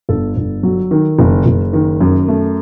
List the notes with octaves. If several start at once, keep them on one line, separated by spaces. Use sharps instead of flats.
G1 A4
G1
F#3
D#3
F#1
F#1
D#3
F#2
A3